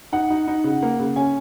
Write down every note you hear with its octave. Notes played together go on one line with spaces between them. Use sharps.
D#4 F#5
D#4
D#4
C#3
A#3
C#3
C#4 G#5